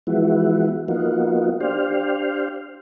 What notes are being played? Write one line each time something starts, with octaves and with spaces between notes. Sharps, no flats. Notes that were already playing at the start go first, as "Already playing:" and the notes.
E3 F3 G#3 B3 E4 F#4
F3 A#3 B3 D#4 F4 F#4
D4 G4 C5 F5